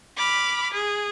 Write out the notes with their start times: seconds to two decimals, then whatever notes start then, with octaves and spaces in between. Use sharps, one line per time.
0.17 B5 D6 F6
0.72 G#4